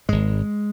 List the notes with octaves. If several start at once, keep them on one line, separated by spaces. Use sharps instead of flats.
G#1 G#2 G#3